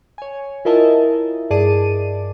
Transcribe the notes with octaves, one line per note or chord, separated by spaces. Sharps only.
C#5 G#5
E4 F4 A#4 D#5 E5 A5
G2 G#4 D5 A5 D6 D#7